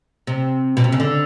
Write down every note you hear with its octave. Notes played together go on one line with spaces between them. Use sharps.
C3
B2
C3
C#3
D3